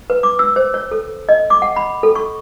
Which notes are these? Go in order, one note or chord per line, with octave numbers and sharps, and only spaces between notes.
B4
D6
E6
C5
C#5
A4
D#5
D6
F#5
B5
A4
C#6